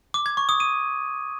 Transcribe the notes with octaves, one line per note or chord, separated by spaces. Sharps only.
D6
G#6
C#6
D#6
D#7